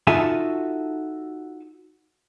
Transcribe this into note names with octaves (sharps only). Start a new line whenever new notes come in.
D#4 F4 F#4 A4 E5 G#5